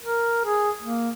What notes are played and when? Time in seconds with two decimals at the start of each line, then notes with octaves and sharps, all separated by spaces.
0.03 A#4
0.45 G#4
0.83 A#3